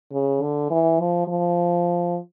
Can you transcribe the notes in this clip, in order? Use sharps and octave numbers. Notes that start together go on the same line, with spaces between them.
C#3
D3
E3
F3
F3